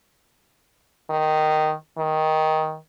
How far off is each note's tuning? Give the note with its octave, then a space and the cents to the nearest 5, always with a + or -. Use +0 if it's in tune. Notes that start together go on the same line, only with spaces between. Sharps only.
D#3 -5
D#3 +10